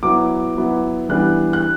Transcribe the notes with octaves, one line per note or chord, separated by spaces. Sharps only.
F#3 B3 E4 D6
F#3 B3 E4
E3 G3 B3 D4 F#6
F#6